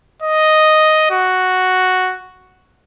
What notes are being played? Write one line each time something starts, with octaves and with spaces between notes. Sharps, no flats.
D#5
F#4